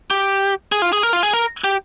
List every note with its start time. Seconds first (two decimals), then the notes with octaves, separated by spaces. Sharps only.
0.11 G4
0.72 G#4
0.82 F4
0.93 G#4
1.03 A#4
1.13 F4
1.23 G#4
1.33 A#4
1.64 G4